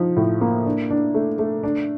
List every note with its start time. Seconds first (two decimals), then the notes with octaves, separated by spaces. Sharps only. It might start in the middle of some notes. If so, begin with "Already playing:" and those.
Already playing: F3 D#4
0.17 A2
0.41 A#3
0.66 D4
0.91 D4
1.14 A3
1.39 A3
1.63 D4